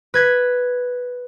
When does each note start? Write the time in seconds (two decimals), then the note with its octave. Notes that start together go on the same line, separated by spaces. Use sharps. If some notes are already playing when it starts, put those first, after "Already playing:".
0.14 B4 G#6 B6